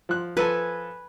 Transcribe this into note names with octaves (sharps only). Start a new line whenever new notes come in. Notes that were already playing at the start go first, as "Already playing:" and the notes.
F3 F#6
F3 A4 B4 G#5 A5